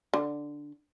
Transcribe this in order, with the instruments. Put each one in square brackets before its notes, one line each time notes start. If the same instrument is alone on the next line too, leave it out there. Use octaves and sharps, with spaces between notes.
[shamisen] D3